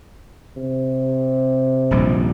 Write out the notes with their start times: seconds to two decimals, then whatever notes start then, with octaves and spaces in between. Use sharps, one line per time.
0.57 C3
1.91 D#1 A#1 G3